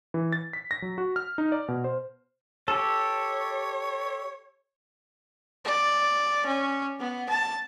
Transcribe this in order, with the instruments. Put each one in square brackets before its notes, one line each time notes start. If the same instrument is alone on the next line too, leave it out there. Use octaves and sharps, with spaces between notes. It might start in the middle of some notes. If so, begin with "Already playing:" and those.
[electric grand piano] E3
A6
B6
A#6
F#3
F#4
F6
D#4
D5
B2
C5
[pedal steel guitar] G4 A4 [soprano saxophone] C#5
[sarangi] D5
C#4
B3
A5